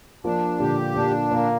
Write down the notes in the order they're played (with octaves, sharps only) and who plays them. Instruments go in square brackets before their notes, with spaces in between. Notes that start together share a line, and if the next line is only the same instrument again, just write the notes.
[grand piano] F3 A#3 [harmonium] D4
[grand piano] A#2 D3 [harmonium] G4
[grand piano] A#2 [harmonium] D4
[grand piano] A#2 [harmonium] A#3